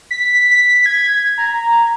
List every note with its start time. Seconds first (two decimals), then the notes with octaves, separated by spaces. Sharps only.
0.11 B6
0.51 B6
0.86 G#6
1.37 A#5